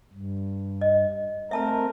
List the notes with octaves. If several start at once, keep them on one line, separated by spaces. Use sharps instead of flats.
G2
D#5
A3 C4 A#4 E5 A5 A#5